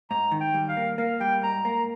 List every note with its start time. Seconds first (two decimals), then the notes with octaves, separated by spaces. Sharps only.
0.10 G#2 A#5
0.32 D#3
0.40 G5
0.54 G3
0.69 F5
0.77 A#3
0.98 A#3 F5
1.20 G3 G5
1.42 G#2 A#5
1.65 A#3 A#5